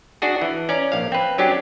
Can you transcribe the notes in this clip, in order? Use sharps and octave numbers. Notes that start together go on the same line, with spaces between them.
D4 F#4 G#4
E3
C#4 D5 A#5
A#1 F5
C4 B4
F#3 C#4 D4 G4